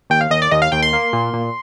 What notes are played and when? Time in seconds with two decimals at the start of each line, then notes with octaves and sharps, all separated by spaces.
0.10 D#2 G5
0.21 F5
0.30 D#2 D#5
0.42 D5
0.51 D#2 D#5
0.62 F5
0.72 D#2 G5
0.82 C6
0.93 A#3
1.13 A#2
1.34 A#2